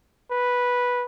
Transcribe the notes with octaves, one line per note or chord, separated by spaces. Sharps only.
B4